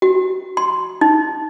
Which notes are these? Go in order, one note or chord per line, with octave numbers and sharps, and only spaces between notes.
F#4
C6
D#4